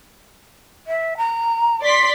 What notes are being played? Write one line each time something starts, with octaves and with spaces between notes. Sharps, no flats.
E5
A#5
D5 C6 B6